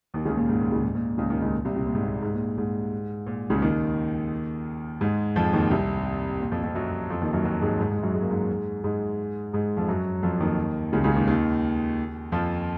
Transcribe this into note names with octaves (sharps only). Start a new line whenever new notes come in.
D#2 D#3
C#2 C#3
A#2
G#2
A#2
C#2 C#3
G#2
A#2
C#2 C#3
D#2 D#3
C#2 C#3
A#2
C2 C3
C3
A#2
G#2
A#2
G#2
A#2
G#2
A#2
C#2 C#3
D#2 D#3
G#2 G#3
F2 F3
D#2 D#3
C2 C3
A#2
F2 F3
F2 F3
F#2 F#3
F2 F3
D#2 D#3
F#2 F#3
F#2 F#3
G#2 G#3
G#2 G#3
G#2 G#3
F#2 F#3
G#3
A#3
G#2 G#3
G#2 G#3
G#2 G#3
F2 F3
F#2 F#3
F2 F3
D#2 D#3
C#2 C#3
C#2 C#3
D#2 D#3
D#2 D#3
F2 F3